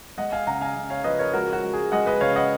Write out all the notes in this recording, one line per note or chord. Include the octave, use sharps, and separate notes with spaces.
G#3 D#5 F#5
F5 G#5
C#3 F#5 A#5
F5 G#5
C#3
C#5 F5
F3 B4 D#5
A#4 C#5
G#3 F#4 A#4
F#4
G#3
G#4
G#3 D#5 F#5
B4 D#5
C#3 C#5 F5
D#5 F#5